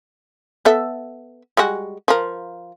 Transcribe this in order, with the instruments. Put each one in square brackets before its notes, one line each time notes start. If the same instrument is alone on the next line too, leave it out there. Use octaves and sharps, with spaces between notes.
[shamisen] B3 A4 E5
G3 G#3 F#4
F3 A#4